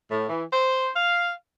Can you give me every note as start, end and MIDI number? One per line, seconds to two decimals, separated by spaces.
0.11 0.28 45
0.28 0.44 52
0.53 0.88 72
0.95 1.32 77